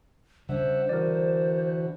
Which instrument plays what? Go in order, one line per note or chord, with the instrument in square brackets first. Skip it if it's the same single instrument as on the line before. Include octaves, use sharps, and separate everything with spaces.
[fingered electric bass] C#3 G3 [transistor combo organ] D4 E5 F#5 [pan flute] C5
[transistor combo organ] D3 E3 F#4 [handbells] A#4 D5